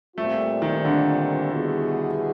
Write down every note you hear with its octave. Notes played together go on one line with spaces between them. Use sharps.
A#2 G3 A3 C4 F4
D#3
D3
B2 G3 B3 E4 G#4